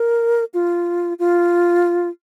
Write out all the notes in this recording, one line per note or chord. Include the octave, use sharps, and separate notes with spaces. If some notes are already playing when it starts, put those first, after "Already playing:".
Already playing: A#4
F4
F4